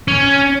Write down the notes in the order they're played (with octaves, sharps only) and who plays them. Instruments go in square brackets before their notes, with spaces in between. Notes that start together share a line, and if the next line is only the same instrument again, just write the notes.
[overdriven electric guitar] C#4